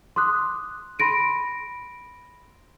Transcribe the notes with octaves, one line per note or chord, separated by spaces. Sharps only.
C6 D6 D#6 F#6
B5 C6 A#6 D7 D#7